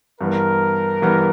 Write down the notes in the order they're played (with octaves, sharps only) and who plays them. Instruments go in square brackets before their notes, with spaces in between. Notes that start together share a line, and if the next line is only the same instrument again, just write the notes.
[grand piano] G2 E3 G3 B3 [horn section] A#4
[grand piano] G2 E3 G3 B3